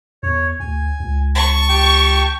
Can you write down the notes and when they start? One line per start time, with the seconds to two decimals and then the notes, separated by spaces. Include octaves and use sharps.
0.23 E2 C#5
0.60 D2 G#5
1.00 C#2
1.35 A5 C#6
1.69 G4 G5 A5